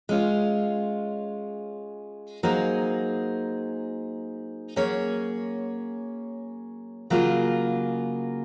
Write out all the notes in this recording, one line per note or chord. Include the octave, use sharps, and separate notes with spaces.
G#3 C#4 F4
F#3 A#3 D#4 G#4 C5
F#3 A#3 C#4 G#4 C#5
C#3 F#3 A#3 F4 G#4